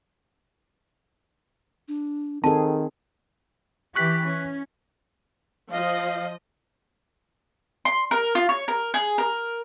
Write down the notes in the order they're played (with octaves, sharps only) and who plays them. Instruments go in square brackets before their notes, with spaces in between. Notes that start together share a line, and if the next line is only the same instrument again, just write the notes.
[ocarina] D4
[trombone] D#3 [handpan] C4 G#4 [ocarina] A4 [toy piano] A5
[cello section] E3 G4 [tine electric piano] C#6 F#6 B6
[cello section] C#4
[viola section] F3 D#5 [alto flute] F5
[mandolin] C6
A#4
F4
C#5
A#4
G#4
A#4